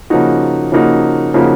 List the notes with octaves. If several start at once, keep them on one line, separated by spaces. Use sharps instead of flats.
C#3 F3 A#3 D#4 F#4
C#3 F3 A#3 D#4 F#4
C#3 F3 A#3 D#4 F#4